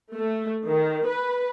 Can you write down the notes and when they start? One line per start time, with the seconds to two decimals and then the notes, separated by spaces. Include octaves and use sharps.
0.15 A3
0.67 D#3
1.06 B4